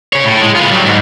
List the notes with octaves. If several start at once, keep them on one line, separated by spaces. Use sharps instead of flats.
G#4 C#5
A2
G#3
F4 B4
F#3 G3
G#2